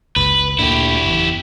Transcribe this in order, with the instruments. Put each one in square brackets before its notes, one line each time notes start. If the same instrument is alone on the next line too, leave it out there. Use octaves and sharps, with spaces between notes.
[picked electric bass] F#1 C#2 [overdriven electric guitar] B4
[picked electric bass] D2 A#2 D3 [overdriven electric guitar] E4 G4
[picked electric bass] F#1 E2